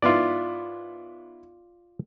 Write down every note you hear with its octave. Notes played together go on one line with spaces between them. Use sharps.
G#2 B3 E4 F4 D5